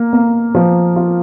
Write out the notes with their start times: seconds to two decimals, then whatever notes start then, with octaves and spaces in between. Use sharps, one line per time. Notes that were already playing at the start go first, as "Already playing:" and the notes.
Already playing: A#3
0.13 A#3
0.55 F3
0.96 F4